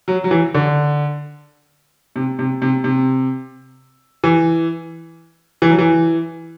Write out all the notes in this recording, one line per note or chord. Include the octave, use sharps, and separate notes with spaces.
F#3
F#3
E3
D3
C3
C3
C3
C3
E3
E3
F#3
E3